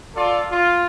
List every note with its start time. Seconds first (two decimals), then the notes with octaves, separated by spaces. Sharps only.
0.15 F4 A4 D5
0.51 F4